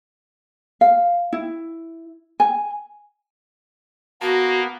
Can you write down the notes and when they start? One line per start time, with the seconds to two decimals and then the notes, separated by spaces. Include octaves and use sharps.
0.81 F5
1.33 E4
2.40 G#5
4.21 A#3 B3 F#4 A5 A#5